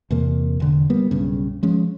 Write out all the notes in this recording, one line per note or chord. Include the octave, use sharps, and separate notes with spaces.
E2 C3 A#3
E1 D3
G3 A#3 B3
B1 G2 C#3
F3 G#3 C#4